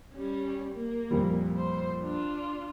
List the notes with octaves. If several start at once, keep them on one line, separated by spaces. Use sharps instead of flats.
G3 C#4
A#3
F2 A#2 G3
C5
D4 F4